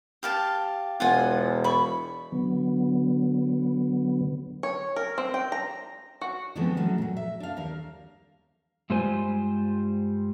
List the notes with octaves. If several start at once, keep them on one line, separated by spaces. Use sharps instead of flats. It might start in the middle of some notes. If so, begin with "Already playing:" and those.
G4 F5 A5
E1 F4 F#5 G#5
B5 C#6
D3 F#3 B3
C#5
A#4
C4
G5
A#5
F#4
D3 E3 F3 G#3 B3 C4
F#3 A3 C#4
A#2 F#3
E5
D4 F5
D#2 G3 A#4 F5
G2 G3 G#3 F4 C5 G#5